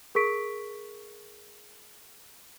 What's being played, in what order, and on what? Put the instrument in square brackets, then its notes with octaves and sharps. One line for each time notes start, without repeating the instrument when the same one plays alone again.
[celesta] G#4 A#4 C#6 B6 D7